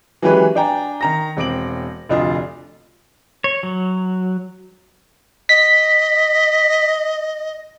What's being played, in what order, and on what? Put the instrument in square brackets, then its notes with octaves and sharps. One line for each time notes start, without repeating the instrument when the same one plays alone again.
[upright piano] E3 F#3 G#3 C#4 G4 B4
D4 D5 G5 G#5 A#5
D#3 A#5 A#6
E1 C4 D6 D7 F#7
F1 D2 D4 F4 D#5
[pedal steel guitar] C#5
F#3
[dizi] D#5 [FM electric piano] B6